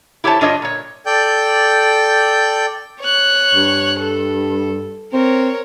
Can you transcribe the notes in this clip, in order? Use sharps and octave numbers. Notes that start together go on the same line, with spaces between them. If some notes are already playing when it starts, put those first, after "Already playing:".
E4 G4 C5 C#5 A5
G2 D4 F4 C#5 D#5
A#2 C#5
A4 D5 G5 G6
C#5 F#6
G2
A4
C4 A#4 C#5